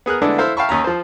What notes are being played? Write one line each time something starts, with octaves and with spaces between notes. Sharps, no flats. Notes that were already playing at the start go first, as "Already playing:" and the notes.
B3 G#4 A#4 F#6
D3 G#3 A3 B3 D4 E4
E4 A4 C5 F5
E5 F5 G5 A5 B5 C#6
D#2 C#4 A#5
F3 C5